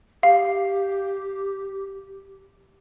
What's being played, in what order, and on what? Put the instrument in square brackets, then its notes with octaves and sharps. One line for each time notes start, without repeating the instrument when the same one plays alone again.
[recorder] G4 [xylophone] F5